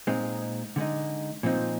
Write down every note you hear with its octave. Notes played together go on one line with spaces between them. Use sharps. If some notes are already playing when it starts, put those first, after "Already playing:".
A#2 G#3 C4 D#4
D3 G#3 D#4
A#2 F3 C4 D#4